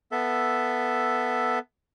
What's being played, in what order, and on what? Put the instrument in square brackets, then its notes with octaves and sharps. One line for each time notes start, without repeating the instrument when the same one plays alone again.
[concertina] B3 A4 E5